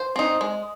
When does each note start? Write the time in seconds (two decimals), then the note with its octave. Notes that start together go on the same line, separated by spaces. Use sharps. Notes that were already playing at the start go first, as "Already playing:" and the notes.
Already playing: C5
0.16 C4 D#4
0.41 G#3